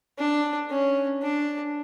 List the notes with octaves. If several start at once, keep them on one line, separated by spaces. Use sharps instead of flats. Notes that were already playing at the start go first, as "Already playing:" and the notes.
D4
C#4
D4